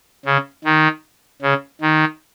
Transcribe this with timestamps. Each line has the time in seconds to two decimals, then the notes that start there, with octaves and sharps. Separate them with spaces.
0.26 C#3
0.64 D#3
1.42 C#3
1.81 D#3